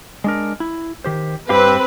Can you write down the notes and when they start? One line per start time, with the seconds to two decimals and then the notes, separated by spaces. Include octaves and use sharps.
0.24 G#3 D4 A#4
0.60 E4
1.04 D#3 G4 C5
1.49 G2 C4 G4 B4 F5